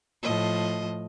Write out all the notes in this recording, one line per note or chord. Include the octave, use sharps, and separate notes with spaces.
A2 F3 D#5